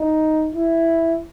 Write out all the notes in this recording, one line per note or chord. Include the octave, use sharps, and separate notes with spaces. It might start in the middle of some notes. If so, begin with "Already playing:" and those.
Already playing: D#4
E4